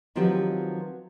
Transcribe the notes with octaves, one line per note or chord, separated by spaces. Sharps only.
D#3 F3 F#3 C4 G4 B4